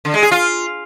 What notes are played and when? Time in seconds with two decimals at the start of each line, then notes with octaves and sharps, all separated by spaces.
0.05 D3
0.14 G#3
0.23 G#4
0.31 F4